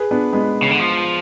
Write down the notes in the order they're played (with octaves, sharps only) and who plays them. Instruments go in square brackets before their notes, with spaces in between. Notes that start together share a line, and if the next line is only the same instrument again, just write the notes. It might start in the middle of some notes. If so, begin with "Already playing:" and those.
Already playing: [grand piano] G#4 B4
B3 D4
G#3 B3
[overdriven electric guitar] C#3
D3
F3